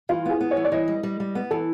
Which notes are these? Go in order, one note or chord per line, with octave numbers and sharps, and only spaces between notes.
E3 F4
B3 G#4
B3
C#5
E3
D5
E3 D#5
G3
G3
G3
B3
E3 A4